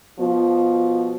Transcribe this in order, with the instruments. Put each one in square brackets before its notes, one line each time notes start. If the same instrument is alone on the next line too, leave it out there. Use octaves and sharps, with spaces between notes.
[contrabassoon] B2 [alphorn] F3